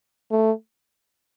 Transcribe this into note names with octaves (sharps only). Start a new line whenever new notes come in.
A3